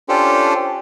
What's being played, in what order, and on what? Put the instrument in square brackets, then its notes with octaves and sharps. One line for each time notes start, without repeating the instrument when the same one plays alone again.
[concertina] C#4 D4 F4 G4 A4 C5